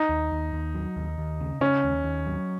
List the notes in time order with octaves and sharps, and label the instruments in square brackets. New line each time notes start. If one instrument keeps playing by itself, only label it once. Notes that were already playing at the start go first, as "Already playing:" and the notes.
Already playing: [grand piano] D#4
[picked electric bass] D#2
D#2
D#2
F#3
D#2
D#2
C#3
[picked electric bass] C#3 [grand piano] C#4
[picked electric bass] D#2
D#2
F#3